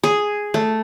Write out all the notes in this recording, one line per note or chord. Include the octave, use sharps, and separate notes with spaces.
G#4
A3